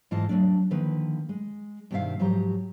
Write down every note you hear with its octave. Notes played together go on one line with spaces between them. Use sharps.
G#2 E3 F4 D#5 A5
F#3 G#3 A3 D4
D3 D#3 F3 A#3 B4
G#3
G2 B2 D#3 C4 E5 F5
G#2 F3 F#3 G4 A#5